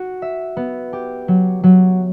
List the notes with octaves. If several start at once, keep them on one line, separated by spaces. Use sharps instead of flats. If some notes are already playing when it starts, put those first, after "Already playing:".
Already playing: F#4
E5
B3
G4
F#3
F#3